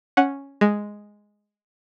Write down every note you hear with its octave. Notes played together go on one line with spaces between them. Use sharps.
C#4 F#5
G#3